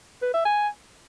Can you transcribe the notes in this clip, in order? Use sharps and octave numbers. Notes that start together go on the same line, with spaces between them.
B4
E5
G#5